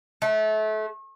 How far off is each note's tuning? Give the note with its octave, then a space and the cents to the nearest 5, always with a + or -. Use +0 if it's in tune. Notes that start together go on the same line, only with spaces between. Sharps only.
A3 -30